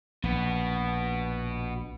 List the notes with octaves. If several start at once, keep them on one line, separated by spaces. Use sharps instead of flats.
A#1 B2 B3